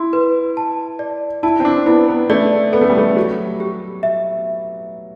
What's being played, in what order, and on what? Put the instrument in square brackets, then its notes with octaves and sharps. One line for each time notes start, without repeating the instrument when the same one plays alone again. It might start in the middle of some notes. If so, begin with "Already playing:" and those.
Already playing: [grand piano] E4 [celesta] C6
[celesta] B4
A5
D5
[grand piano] E4 [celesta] A5
[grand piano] C4
D4
[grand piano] B3 [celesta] E4
[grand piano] B3
[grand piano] A3 [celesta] D5
[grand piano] B3 [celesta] A4
[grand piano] A3
G3
A3
[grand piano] F#3 [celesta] G4
[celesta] G4
E5